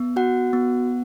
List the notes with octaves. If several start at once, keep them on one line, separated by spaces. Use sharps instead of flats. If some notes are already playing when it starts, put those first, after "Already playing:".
Already playing: B3
F#4 F#5
B3